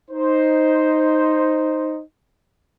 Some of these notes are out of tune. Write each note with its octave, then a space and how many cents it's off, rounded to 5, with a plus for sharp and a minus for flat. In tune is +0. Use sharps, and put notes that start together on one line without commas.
D#4 +0 C5 +0